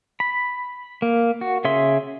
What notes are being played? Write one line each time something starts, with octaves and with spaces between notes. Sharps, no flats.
B5
A#3
F#4
C#3 G#4 E5 C6